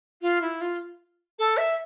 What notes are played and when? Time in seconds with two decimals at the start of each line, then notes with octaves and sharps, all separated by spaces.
0.21 F4
0.41 E4
0.60 F4
1.38 A4
1.57 E5